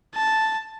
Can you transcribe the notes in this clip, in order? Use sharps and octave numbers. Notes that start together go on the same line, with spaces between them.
A5